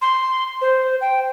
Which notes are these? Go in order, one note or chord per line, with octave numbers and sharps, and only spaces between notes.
C6
C5
G5